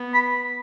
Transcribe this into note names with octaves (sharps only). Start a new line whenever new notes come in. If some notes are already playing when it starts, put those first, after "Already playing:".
Already playing: B3
B5